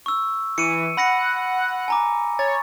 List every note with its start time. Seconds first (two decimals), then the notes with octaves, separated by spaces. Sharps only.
0.06 C#6 E6
0.58 E3 C#7 D#7
0.97 F#5 B5 A#6 C#7
1.88 G#5 A#5 D6
2.39 C#5 A6